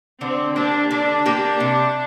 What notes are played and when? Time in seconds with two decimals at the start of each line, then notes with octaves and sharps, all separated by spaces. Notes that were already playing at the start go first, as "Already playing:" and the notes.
0.21 D3 C4
0.56 A#3 D4 G4
0.91 D3 D4
1.26 A#3 G4
1.60 C3